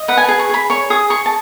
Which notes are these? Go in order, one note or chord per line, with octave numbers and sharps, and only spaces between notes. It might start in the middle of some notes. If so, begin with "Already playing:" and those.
Already playing: D#5
B4 F#5
G#5
G#4 A5
C#6
G#4 B5
C#5 C#6
G#4 D#6
G#4 C#6
A5